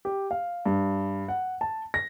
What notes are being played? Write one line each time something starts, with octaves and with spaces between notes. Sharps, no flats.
G4
F5
G2
F#5
A5
A#6